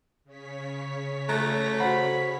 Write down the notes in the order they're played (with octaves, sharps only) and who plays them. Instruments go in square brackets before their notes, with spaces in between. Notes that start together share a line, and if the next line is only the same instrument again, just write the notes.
[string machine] C#3 C#5 B6
[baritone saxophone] A3 [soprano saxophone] A#5 [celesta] F#6
[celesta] F#4 C5 F#5 [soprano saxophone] B5